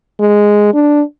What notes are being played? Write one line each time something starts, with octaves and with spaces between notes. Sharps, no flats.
G#3
D4